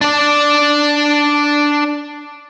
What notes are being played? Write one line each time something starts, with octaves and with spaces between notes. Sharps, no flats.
D4 D5